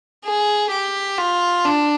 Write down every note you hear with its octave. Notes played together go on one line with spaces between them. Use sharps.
G#4
G4
F4
D4